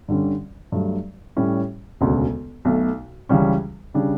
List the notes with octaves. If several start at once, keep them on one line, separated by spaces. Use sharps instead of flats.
G2 D3 G3 C#4
G2 F#3 A3
A2 G3 C#4 E4
E1 D2 C#3
B1 B2 A3
C#2 C#3 E3 G3 C#4
C#3 G3 D4